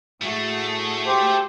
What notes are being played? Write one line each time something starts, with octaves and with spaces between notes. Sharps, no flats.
A2 A3 F#4 G#4
G4 C5